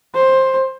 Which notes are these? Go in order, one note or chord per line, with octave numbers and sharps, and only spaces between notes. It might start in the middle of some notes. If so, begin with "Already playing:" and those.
C5